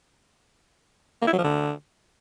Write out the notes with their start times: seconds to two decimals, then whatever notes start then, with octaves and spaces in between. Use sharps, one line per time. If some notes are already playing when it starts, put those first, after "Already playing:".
1.22 A#3
1.27 E4
1.33 F#3
1.38 F3
1.44 D3